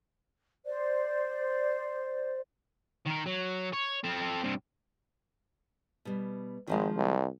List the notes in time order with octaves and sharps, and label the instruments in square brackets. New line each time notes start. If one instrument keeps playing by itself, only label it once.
[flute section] C5 D5
[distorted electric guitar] D#3 A#4
F#3
C#5
C4 A4
G2 C3
[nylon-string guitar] B2 G3
[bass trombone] G#1 [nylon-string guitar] D#3 F3 G#3
[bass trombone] C2